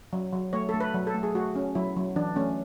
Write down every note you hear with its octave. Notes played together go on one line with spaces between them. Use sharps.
F#3
F#3
A3 C#5
A3 A4
B4
F#3
A4
A3
G#4
A3 F#4
C#4
F#3 E4
F#3
E3 D4
A3 C#4